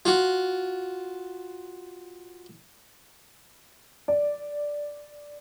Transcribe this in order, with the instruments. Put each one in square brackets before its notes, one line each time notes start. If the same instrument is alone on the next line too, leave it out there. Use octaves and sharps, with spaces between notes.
[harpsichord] F4 F#4
[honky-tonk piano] D5